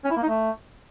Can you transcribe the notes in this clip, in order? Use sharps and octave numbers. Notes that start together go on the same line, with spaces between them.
C#4
E4
A#3
D#4
A3